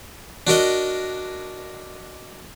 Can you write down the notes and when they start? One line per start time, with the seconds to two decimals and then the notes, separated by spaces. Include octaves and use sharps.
0.47 D4 F#4 A#4 D#5